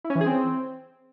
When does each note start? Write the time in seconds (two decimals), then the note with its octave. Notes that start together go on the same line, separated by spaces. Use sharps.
0.04 E4
0.10 C#4
0.15 E3
0.21 G#4
0.26 C4